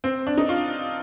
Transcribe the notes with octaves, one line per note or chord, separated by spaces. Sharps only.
C4
D4
D#4
F4